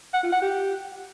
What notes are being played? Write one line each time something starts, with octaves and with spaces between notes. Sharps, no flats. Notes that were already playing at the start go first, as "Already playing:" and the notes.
F#5
F4
F#5
G4